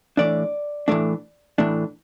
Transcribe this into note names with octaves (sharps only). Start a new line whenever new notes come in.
A2 E3 A3 D4 D5
A2 E3 A3 D4
A2 E3 A3 D4